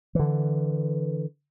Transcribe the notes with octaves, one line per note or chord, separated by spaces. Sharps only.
D3 E3